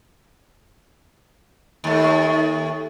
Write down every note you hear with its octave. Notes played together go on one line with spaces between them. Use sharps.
D#2 A3